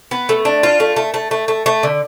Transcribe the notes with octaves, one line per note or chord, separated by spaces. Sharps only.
B3
A3
D4
F4
A3
A3
A3
A3
A3
A3
D3